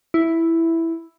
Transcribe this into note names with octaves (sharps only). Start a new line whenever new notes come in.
E4